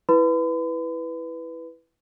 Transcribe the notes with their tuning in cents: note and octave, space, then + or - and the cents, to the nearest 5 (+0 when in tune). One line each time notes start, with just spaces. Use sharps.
E4 +0 B4 +0 B5 +45